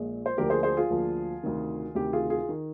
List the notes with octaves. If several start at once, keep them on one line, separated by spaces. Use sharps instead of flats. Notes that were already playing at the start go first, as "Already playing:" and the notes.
Already playing: A#1 A#2 G#3
C5
D2 D3 F3 A#3 G4 A#4
G#4 C5
G#4 C5
F4 G#4
D2 D3 F3 A#3
D2 C3 D#3
D2 C3 D#3 G4
F4 G#4
F4 G#4
D#3